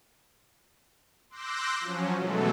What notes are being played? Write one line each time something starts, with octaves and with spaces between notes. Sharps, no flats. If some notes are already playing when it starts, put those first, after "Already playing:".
C6 D6 E6 F#6 G6 A#6
F3 F#3 C#4
B2 E3 F#3 G#3 A3 A4